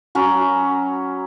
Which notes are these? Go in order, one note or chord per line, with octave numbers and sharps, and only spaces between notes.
F#3 C#4 A#5 B5